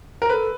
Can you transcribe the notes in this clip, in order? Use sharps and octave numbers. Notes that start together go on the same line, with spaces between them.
A#4
A4 B4